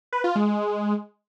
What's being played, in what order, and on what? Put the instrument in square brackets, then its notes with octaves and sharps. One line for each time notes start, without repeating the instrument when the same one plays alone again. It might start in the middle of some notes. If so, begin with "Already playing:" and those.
[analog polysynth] B4
F4
G#3